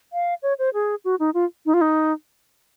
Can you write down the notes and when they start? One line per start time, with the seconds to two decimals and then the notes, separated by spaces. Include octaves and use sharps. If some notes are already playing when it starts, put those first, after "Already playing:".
0.13 F5
0.43 C#5
0.59 C5
0.74 G#4
1.05 F#4
1.19 D#4
1.34 F4
1.66 D#4
1.74 F4
1.81 D#4